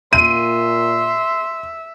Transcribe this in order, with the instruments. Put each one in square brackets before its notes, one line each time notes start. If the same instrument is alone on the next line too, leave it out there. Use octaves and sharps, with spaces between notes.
[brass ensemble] A#2 [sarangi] E5 [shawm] C6 [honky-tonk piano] D#7